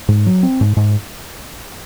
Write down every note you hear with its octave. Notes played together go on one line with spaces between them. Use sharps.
G#2
F#3
C4
G#2
G#2